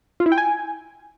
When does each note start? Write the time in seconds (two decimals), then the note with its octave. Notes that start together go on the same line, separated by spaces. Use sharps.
0.20 F4
0.26 E4
0.32 G5
0.38 G#5